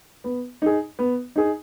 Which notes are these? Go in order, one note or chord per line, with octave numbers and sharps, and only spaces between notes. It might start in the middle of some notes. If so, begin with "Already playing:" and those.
B3
D#4 G#4
B3
D#4 G#4